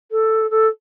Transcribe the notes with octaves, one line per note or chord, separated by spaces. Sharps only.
A4
A4